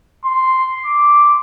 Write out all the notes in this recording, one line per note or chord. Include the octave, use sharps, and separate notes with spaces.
C6
D6